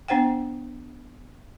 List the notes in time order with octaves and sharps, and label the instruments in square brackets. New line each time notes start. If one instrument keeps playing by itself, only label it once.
[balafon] B3 D4 C5 F#5 G5